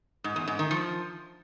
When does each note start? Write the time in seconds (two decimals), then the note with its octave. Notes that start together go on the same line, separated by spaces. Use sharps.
0.24 G#2
0.36 E2
0.48 G#2
0.59 D#3
0.71 F3